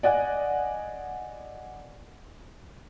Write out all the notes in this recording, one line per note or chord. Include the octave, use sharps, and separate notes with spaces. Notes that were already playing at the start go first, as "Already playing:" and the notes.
D5 D#5 F#5 G#5